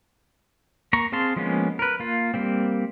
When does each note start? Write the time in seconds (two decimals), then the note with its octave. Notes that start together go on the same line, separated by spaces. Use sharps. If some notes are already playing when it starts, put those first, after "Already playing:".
0.93 A#3 A#5 C#6
1.12 C4 G#4 F5 A5 C6
1.37 F3 G#3 A#3 B3 C#4
1.79 A#4 B4
2.00 A#3 F4
2.34 G3 A#3 C4